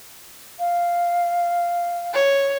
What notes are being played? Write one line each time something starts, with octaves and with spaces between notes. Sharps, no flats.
F5
C#5